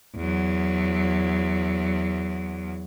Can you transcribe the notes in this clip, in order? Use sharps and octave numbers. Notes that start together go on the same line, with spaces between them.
E2 F#3